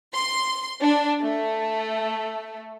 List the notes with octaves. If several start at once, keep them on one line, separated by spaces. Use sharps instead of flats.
C6
D4
A3